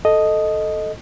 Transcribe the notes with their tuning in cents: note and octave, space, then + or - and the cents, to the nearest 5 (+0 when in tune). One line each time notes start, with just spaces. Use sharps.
A4 +0 D#5 +0